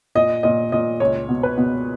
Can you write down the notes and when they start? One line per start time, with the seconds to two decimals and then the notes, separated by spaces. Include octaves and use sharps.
0.15 A#2 D#5
0.43 A#2 D#5
0.72 A#2 D#5
1.00 C#2 C#5
1.29 B2
1.43 B4
1.57 B2